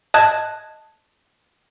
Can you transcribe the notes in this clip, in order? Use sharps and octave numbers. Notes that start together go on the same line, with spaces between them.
D#5 A5 D#6 F#6 G#6